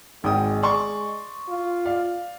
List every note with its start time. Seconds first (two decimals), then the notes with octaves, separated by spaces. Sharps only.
0.24 G#1 G#3 G5 D#6
0.63 D5 C6 C#6
1.49 F4
1.85 D5 F5